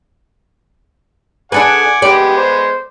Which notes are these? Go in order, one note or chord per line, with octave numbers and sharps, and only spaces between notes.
D4 G#4 A4 B4 D5 F#5 G#5
G#3 B3 G4 D5
C5